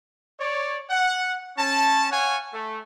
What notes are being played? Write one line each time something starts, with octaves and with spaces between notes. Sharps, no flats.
C#5 D5
F#5
C#4 A5
C#5 F5 F#5 G#5
A3